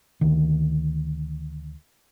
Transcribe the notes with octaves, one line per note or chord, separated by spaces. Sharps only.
D2 D#3